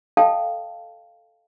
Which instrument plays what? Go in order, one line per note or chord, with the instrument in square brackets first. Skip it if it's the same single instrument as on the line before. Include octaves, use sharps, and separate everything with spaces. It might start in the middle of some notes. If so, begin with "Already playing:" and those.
[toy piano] A4 D#5 F5 G5 A5